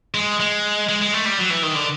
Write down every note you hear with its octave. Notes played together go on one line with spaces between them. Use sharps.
G#3
G#3
G#3
G#3
A3
G3
F#3
E3
D#3
D3